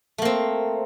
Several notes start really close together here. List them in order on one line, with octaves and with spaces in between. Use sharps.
A3 A#3 C4